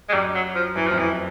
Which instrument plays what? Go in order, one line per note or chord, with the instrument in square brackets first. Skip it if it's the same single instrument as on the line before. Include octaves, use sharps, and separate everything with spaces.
[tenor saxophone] G#3
[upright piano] F#2 [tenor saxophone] G3
[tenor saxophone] F#3
F3
[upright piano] F#2 [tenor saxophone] E3
[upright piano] F2 [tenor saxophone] F3
[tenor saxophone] E3